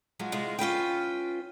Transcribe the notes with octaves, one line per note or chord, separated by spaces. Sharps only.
F3 F#3 G#3
C3 G#3 F4
C#4 F4 B4 G5